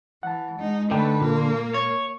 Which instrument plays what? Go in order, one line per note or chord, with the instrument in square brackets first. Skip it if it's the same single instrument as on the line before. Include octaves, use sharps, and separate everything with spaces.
[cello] E3 [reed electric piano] F#5 A5
[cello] G#3 D#4
[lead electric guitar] D3 [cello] A3 B4 [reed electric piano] D#4 G5
[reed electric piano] A#2 [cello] A#3
[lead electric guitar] C#5